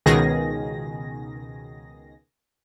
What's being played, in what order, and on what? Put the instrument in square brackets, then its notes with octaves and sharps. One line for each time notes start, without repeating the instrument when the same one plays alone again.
[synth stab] C#2 B2 D#3 G#4 A#6